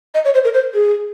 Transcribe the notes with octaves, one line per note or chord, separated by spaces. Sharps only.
D#5
C#5
C5
A#4
C5
G#4